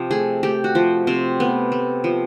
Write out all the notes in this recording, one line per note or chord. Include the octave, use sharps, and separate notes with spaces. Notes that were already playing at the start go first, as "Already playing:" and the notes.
Already playing: C3 F3
A3 G#4
A3 G4
F#4
F3
C3 C4
A3 B3
A3
F3